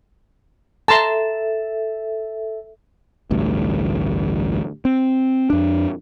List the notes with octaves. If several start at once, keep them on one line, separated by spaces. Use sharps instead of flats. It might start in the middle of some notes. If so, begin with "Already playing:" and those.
A4 E5 A5 A#5 C6
A1 D2 G2
C4
F2 D4